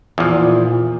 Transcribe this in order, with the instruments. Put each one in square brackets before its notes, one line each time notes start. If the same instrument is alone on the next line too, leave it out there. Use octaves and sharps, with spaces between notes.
[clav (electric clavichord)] E2 F3 [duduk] A#2